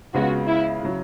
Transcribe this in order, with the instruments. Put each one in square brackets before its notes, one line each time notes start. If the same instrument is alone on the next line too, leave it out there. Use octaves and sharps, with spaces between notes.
[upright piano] C#2 C#3 G#3 B3 [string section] F#4
[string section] E4
[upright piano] C#3 F#3